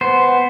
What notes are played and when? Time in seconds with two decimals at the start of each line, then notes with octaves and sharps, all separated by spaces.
0.01 B3 C5